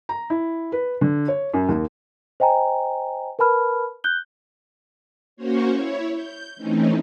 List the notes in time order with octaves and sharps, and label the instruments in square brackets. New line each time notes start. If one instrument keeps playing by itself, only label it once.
[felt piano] A#5
E4
B4
D3
C#5
F#2
D#2
[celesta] C5 D#5 G5 G#5 A#5
A#4 B4 A5 B5 F6
F#6 G6 G7
[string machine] A#3 C#4 F#4 C5 C#5
E4 C#5
G6
E3 A3 C4 C#4 D#4